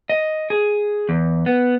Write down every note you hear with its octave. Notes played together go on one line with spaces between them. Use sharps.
D#5
G#4
E2
B3